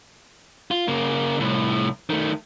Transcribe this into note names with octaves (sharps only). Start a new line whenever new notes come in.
F4
C#3 A#3
C2 A2
D#3 A3